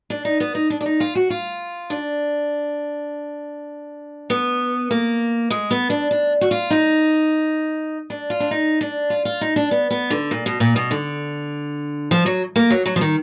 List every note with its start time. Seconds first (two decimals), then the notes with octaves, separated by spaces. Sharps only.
0.10 D4
0.25 D#4
0.40 B3
0.55 D#4
0.70 D4
0.81 D4
0.86 D#4
1.00 F4
1.15 F#4
1.30 F4
1.90 D4
4.30 B3
4.91 A#3
5.50 G#3
5.71 B3
5.90 D4
6.11 D4
6.41 F#4
6.51 F4
6.70 D#4
8.10 D4
8.30 F4
8.40 D4
8.51 D#4
8.81 D4
9.10 F4
9.25 F4
9.41 D#4
9.56 D4
9.71 B3
9.91 B3
10.10 D3
10.31 A#2
10.46 B2
10.60 A#2
10.76 B2
10.91 D3
12.11 F3
12.26 F#3
12.56 A#3
12.70 F#3
12.86 F#3
12.96 F3
13.01 D#3